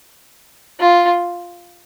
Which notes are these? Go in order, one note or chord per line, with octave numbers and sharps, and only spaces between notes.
F4